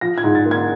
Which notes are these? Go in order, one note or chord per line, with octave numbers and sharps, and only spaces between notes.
F3 A#6
G#6
G#2
A6
A#3
G#6